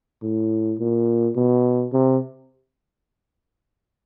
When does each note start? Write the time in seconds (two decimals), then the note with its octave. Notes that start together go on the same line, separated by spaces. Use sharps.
0.22 A2
0.79 A#2
1.36 B2
1.93 C3